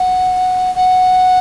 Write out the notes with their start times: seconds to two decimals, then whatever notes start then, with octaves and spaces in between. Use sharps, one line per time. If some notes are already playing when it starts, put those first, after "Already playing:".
Already playing: F#5
0.74 F#5